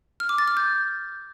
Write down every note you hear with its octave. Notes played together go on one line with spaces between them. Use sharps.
F6
D6
A6
F6
G6